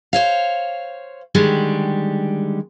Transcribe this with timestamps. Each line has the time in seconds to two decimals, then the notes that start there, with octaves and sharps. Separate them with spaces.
0.13 C5 C#5 F5
1.35 D3 D#3 G3 G#3